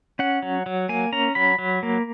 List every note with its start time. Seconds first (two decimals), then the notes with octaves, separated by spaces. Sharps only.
0.19 C#4 F#5
0.43 F#3
0.66 F#3
0.89 A#3 G#5
1.12 C#4 A#5
1.35 F#3 B5
1.59 F#3
1.83 A#3